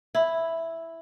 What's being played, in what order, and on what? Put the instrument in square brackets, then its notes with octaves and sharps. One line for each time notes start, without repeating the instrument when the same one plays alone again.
[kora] E4